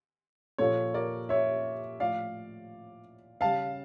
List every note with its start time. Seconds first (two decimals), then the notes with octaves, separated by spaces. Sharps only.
0.58 A#2 F3 A4 C#5
0.94 A#4 D5
1.29 C#5 E5
2.00 A2 F3 D5 F5
3.41 C#3 G3 F5 A5